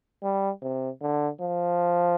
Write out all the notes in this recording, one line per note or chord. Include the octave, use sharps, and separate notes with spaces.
G3
C3
D3
F3